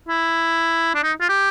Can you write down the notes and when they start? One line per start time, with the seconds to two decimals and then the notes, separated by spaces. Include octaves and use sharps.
0.09 E4
0.95 D4
1.03 D#4
1.21 F4
1.29 G4